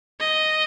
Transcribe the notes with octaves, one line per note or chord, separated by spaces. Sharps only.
D#5